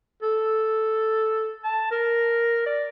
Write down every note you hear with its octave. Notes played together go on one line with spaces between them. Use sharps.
A4
A5
A#4
D5